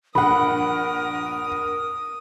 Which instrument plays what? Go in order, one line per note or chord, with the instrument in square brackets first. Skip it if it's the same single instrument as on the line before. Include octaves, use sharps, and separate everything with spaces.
[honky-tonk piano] A#1 G2 F#5 [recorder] A#4 [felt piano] B5 [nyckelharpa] D#6